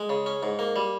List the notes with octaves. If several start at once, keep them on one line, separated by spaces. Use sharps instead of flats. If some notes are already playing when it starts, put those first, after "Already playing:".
Already playing: G#3
C#3
C#4
G#2
A#3
G3